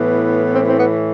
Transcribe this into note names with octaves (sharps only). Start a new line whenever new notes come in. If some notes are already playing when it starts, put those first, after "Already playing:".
Already playing: A2 E3 B3
C4
C4
B3